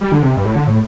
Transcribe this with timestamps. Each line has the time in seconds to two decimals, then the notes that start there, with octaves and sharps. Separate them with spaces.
0.01 G3
0.12 D3
0.23 C3
0.37 G2
0.45 A2
0.56 D3
0.67 A2